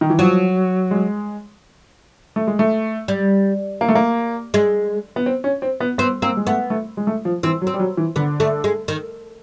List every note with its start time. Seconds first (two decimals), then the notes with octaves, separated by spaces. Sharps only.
0.01 D#3
0.10 E3
0.19 F3 F#3
0.91 G#3
2.36 A3
2.47 G#3
2.59 A3
3.08 G3
3.81 A#3
3.89 A3
3.95 A#3
4.54 G#3
5.16 B3
5.26 C4
5.44 C#4
5.62 C4
5.80 B3
5.98 B3 C4
6.22 A#3 C4
6.37 G#3
6.46 A3 B3
6.70 A3
6.97 G#3
7.07 A3
7.25 F3
7.43 E3 C4
7.62 F#3
7.67 C4
7.74 G3
7.80 F#3
7.97 E3
8.16 D3 B3
8.40 A3
8.64 G#3
8.88 D#3